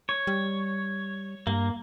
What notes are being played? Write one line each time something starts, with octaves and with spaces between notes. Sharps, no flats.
C#5
G3
G2 A#3